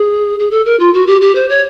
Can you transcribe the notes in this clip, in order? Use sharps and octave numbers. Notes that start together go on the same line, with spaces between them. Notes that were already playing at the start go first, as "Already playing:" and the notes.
Already playing: G#4
G#4
A4
A#4
F4
F#4
G4
G4
C5
C#5